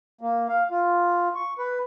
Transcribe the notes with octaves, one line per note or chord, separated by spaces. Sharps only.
A#3
F5
F4
C#6
B4